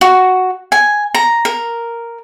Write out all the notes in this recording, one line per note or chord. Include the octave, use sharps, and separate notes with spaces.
F#4
G#5
A#5
A#4